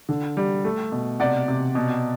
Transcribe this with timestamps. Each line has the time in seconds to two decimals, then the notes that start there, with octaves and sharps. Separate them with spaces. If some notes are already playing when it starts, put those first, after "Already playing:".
0.09 D3
0.37 G3
0.65 A3
0.92 B2
1.20 C3 D5 F#5
1.48 C3
1.75 B2